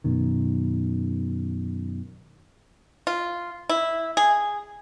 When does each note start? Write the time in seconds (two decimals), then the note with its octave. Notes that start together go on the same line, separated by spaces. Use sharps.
0.04 F#2 B2 D#3
3.07 F4
3.69 E4
4.17 G#4